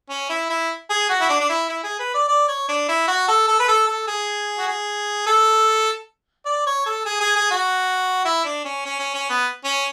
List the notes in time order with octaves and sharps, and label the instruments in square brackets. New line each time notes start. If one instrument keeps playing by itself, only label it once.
[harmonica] C#4
E4
E4
G#4
F#4
E4
D4
D4
E4
E4
G#4
B4
D5
D5
C#5
D4
E4
F#4
A4
A4
B4
A4
A4
G#4
F#4
G#4
A4
D5
C#5
A4
G#4
G#4
G#4
F#4
E4
D4
C#4
C#4
C#4
C#4
B3
C#4